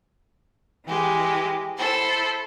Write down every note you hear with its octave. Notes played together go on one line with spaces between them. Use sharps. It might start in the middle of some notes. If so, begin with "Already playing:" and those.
E3 G#3 G4
E4 A4 C5